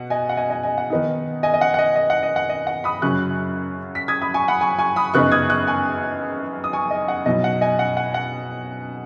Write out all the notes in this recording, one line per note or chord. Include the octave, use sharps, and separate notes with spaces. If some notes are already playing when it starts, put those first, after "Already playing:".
Already playing: B2 F#5
D#5 G#5
F#5
D#5 G#5
D#5 G#5
D#5 G#5
F#5
D#3 B3 D#4
D#5 G#5
D#5
F#5
F#5
D#5
D#5
F#5
D#5
F#5
D#5
F#5
B5 D#6
F#2 C#3 F#3 C#4 C#6 F#6
B6
D#6 G#6
B5 D#6
G#5 C#6
F#5 B5
G#5 C#6
G#5 C#6
B5 D#6
F#2 C#3 B3 D#4 C#6 F#6
D#6 G#6
C#6 F#6
G#5 C#6
D#6
G#5 C#6
D#5
F#5
B2 F#3 D#4 D#5
F#5
D#5 G#5
F#5
F#5
F#5